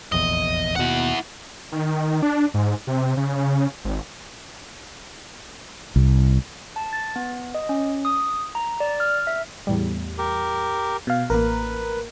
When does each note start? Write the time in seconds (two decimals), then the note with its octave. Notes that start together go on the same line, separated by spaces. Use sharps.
0.12 F1 A#1 E2 D#5
0.76 D#2 B2 E4 F#5
1.72 D#3
2.22 D4
2.54 G#2
2.87 C3
3.17 C#3
3.85 G#1
5.96 C2
6.76 A5
6.93 A6
7.16 B3
7.55 D#5
7.69 C#4
8.05 D#6
8.55 A#5
8.80 D5
9.00 F6
9.27 E5
9.67 E2 A2 G3
10.18 G4 A#4
11.07 B2 F5
11.30 A1 A#3 A#4 B4